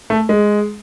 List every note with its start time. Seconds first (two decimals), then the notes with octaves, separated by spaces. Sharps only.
0.10 A3
0.29 G#3